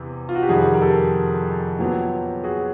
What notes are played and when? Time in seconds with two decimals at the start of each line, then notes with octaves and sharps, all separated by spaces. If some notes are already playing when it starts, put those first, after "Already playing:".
Already playing: E2 C3 E3
0.29 F4
0.35 F#4
0.42 G4
0.49 F2 C3 D#3 G3 F#4 G#4
0.74 A#4
0.82 G4 A4
1.79 A#2 F#3 B3
2.44 F#4 G#4